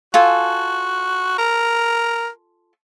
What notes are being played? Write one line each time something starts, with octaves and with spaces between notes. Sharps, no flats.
F4 F#4 A4 G#5
A#4